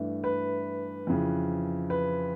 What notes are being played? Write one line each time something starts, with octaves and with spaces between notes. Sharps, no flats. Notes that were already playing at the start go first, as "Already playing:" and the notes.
Already playing: G2 E3 A3 D4
B4
F2 C#3 E3
B4